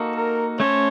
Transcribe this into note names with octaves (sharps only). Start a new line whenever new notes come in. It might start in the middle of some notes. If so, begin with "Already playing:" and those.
Already playing: A#3 D#4 F#4 A4
A#4
A3 C#4 A4 C5 C#5